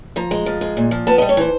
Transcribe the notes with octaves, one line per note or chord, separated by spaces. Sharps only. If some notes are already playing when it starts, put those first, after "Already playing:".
F3 A#5
G#3
F3
G#3
A#2
F3
B3 A5
G3 D#5
C#5
E3 C5